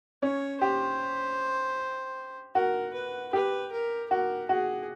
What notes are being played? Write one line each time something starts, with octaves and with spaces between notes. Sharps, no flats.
C#4 C#5
G4 C5
F#4 A#4
B4
G4 B4
A#4
F#4 A#4
F#4 G#4